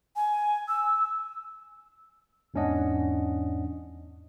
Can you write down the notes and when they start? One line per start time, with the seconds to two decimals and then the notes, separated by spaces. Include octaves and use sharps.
0.16 G#5
0.68 E6
2.54 E2 G#2 C#4 D4 D#5 F#5